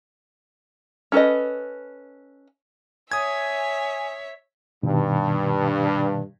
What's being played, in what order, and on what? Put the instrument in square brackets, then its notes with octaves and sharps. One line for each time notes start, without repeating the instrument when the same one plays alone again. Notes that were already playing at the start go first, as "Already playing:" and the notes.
[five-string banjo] C#4 A4 B4 D#5
[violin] C#5 E5 [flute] G#5 [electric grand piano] D#6 G#6
[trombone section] G2 [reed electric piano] B2 D#3